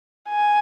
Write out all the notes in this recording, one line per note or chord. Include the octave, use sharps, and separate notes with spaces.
G#5